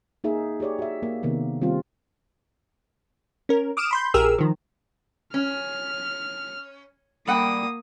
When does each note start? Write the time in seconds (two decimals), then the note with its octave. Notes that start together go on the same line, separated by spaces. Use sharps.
0.24 A#3 D#4 G#4 E5
0.60 G4 G#4 C#5 D5
0.79 F#4 E5
1.03 A#3
1.23 C3 D#3 A#3 B3
1.61 D#3 G3 C4 F4
3.49 C#4 A#4
3.77 D6 D#6 F6 D7 E7
3.91 B5 C6 G6
4.14 A#1 G4 G#4 A#4 E6 F6
4.38 D#3 F3
5.34 C#4 F6
7.27 G3 A#3 F#5 G5 D#6